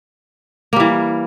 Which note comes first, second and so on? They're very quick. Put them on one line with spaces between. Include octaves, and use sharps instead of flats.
A#3 G3 E3